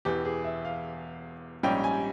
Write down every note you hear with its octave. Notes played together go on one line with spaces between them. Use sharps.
E1 E2 E3 G4
G#4
E5
F5
A#1 G#2 G3 C#4 G5
G#5